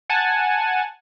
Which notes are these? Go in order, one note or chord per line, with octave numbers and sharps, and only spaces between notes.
F#5 G#5 A5